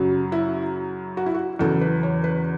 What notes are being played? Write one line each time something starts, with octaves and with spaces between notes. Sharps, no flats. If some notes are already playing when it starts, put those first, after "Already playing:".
Already playing: F#2 C#3 F#3
E4
F#4
E4
F#4
E2 C#3 F#3 A4
B4
C#5
B4